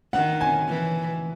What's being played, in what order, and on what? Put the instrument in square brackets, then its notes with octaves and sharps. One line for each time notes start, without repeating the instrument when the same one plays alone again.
[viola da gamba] D#3 [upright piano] F#5
[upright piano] G#5
[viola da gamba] E3